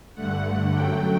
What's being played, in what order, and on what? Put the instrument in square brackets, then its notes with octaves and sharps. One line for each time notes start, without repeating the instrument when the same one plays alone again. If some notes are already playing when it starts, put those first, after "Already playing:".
[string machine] G2 D3 A3 F#5
F#5
F#2 F#3 A3 G5